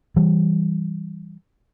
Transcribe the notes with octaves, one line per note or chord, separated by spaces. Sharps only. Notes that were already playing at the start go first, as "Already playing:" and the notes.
E3 G3